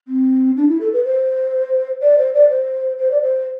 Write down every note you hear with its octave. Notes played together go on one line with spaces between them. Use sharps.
C4
D4
E4
A4
B4
C5
D5
C5
D5
C5
C5
D5
C5